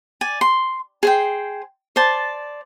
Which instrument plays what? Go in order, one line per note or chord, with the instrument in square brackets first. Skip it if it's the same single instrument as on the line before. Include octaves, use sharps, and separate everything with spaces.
[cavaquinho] D5 G#5
C6
G#4 C5 G5
C5 D5 A5